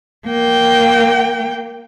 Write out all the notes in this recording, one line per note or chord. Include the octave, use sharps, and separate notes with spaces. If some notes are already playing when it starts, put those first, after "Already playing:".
A#3 G5